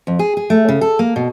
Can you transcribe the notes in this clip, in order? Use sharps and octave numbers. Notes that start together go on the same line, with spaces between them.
F2
G#4
G#4
A3
C#3
A4
A#3
B2